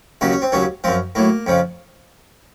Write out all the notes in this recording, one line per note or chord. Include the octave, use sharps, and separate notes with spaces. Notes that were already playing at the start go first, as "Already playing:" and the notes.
D#2 C#3 F#3 D#4
C#4
C4
D#2 C#3 F#3 C#4
F#2 F3 C4
A2 F#3 A#3
F2 C#3 F3